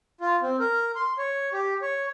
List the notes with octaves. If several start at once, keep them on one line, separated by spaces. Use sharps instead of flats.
F4
C4
A#4
C6
C#5
G4
C#5